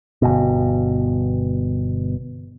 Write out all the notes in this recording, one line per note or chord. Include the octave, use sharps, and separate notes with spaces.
G1 B2